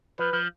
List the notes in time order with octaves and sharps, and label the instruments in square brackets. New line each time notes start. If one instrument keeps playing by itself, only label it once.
[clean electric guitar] F3 [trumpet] B4
[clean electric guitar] F3